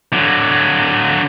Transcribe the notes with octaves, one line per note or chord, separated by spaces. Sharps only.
D3 F#3